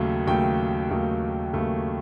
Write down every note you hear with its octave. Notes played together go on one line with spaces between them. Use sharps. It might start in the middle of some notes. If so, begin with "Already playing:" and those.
Already playing: D#2 C#3 F#3 A3
D#2 C#3 F#3 A3 G5
D#2 C#3 F#3 A3
D#2 C#3 F#3 A3